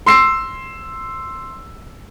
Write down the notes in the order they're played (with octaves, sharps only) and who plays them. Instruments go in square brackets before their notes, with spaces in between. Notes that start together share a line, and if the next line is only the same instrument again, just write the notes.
[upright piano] C6 E6 C7